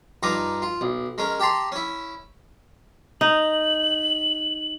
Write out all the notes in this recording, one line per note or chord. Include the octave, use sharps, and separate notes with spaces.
G2 D#4 F4 D#5 A#5 D6
F4
B1
G#3 C#4 A#4
G4 G5 A5 A#5 C6
C#4 E4
D#4 F#7